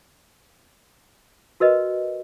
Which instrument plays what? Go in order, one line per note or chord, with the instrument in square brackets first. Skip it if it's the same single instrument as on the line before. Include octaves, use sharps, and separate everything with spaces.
[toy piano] F#4 A#4 B4 D#5